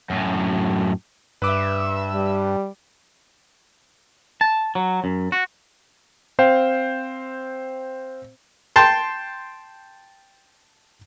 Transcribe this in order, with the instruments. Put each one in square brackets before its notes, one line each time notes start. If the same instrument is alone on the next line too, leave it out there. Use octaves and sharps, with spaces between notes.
[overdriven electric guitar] F#2 A2
[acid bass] G2 [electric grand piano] B4 D6 [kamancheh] E5 E6
[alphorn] G3
[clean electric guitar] A5
F#3
F#2
F#4
[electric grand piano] C4 C5 F5 G5
[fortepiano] G5 A5 C6